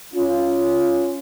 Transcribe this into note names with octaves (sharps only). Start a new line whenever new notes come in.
C#4 F4